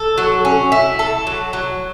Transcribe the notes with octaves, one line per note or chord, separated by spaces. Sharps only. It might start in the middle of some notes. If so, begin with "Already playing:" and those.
Already playing: A4
F#3
C#4
E4
A4
F#3
F#3